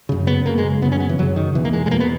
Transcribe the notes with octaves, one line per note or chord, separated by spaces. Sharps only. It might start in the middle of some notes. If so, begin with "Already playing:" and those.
F#2 C#3
B3
F#2 C#3 A#3
G#3
F#2 C#3 B3
C#4
B3
E3
F#2 C#3 F#3
D#3
E2 B2 E3
A#3
G#3
G#3
E2 B2 A#3
B3